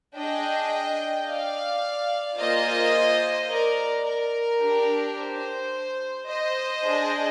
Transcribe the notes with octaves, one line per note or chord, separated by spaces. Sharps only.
D4 G#4 D#5 G5
D5 F5
A#3 F4 G#4 C5 D#5
A#4 D5
A#4
D4 G4
C5
C5 D#5
D4 G#4